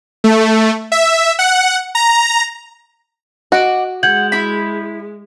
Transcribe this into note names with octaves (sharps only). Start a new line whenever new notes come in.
A3
E5
F#5
A#5
F#4 D#5 F#5 D6
G#3 F#5 G6 G#6 F#7
E4 B5